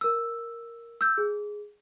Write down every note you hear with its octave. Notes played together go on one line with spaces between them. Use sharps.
A#4 E6
E6 G6
G#4